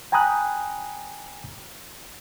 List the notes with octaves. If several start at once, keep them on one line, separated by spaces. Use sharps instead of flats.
G5 G#5 A#5 B5 D#6 F#6